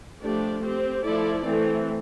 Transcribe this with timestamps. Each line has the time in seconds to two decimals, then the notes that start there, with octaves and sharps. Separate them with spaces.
0.22 F3 A3 D4 G4 D5
0.63 C4 G4 C5
1.05 F3 A3 E4 A4 D5
1.46 E3 A3 C4